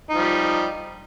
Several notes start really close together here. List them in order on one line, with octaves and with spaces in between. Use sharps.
D#4 F3 G3